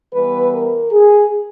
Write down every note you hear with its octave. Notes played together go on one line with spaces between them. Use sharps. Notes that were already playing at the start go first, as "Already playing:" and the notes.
E3 G3 B3 B4
A#4
G#4